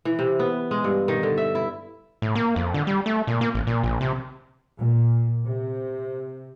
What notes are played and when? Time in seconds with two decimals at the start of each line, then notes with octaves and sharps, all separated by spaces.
0.05 E3
0.19 C3
0.39 B3
0.71 G#3
0.84 G2
1.08 D#3
1.23 D3
1.38 E5
1.55 E4
2.22 A2
2.35 A#3
2.56 F2
2.74 D3
2.87 G3
3.06 A3
3.27 A#2
3.41 A#3
3.54 A1
3.67 A#2
3.83 A#1
4.01 C3
4.77 A#2
5.44 C3